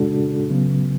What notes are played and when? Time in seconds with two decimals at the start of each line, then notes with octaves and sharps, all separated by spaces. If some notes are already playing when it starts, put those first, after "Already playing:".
Already playing: C#3 G#3 D4 F#4 A4
0.50 C#3 F#3 B3